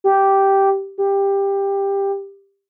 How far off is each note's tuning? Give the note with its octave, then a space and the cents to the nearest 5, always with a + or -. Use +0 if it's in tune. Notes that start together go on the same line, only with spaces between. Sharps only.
G4 -5
G4 +15